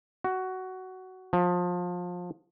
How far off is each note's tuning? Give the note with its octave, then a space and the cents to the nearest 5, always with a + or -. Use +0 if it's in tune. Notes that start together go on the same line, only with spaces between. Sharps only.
F#4 +15
F3 +25